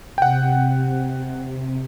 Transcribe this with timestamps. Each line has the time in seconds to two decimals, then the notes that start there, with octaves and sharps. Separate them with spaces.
0.18 C3 F#5 G5